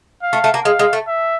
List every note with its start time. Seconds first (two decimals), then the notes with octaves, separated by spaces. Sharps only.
0.23 F5
0.33 A3
0.44 A3
0.54 A#3
0.65 G#3 F5
0.79 G#3
0.93 A3
1.08 E5